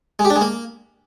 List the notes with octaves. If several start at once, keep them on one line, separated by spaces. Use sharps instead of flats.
G#3
G4
D4
G#3
A#3